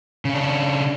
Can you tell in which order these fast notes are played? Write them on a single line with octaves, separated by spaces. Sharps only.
C#3 C#4 D4